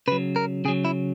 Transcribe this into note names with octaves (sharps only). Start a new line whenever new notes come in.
C#3 F#3 B4
A#4
C#3 F#3 G#4
E4